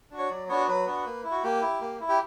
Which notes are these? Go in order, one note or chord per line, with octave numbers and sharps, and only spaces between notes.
D4 F#4
C#5
F#3 D5
B3 D4 F#4 C#5
F#3 B4
B3 D4 F#4
A#3
E4
F#4
A#3 G4
E4
A#3
E4
G4